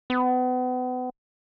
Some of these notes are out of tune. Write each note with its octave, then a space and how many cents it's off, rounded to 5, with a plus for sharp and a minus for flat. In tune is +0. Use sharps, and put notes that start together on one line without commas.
B3 +35